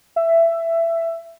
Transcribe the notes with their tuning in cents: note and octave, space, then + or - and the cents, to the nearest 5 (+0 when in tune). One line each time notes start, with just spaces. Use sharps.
E5 +15